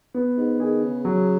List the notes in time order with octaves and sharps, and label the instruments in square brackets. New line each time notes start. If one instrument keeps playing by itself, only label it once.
[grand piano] B3
[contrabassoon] G#2
[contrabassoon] D#3 [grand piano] G#4
[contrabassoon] C#3
[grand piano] F#3